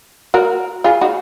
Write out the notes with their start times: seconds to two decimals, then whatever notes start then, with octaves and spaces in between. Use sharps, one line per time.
0.34 F#4 A#4
0.84 F4 G#4
1.01 D#4 F#4